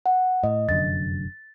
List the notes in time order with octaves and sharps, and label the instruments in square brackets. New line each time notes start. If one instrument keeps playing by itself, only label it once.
[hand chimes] F#5
[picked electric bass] A2 [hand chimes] D#5
[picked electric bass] F1 F#2 D3 [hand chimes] A6